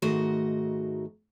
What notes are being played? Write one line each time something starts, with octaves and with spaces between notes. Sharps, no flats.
G#2 D#3 A3 F#4 D#5